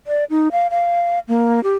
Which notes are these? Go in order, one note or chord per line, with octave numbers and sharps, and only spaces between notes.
D5
D#4
F5
F5
A#3
G4